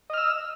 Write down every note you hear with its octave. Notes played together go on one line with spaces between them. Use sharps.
D#5 E6 F6